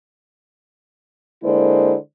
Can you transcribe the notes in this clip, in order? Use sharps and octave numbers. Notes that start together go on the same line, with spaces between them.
D3 G#3 A#3 E4 C5 D5